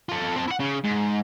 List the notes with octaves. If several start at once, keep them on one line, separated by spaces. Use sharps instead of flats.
F4 A4
C4 A5
E4 F#5
C#3
G#2